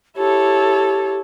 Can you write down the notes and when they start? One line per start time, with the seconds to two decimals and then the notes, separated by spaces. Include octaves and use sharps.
0.17 E4 G4 A4 C#5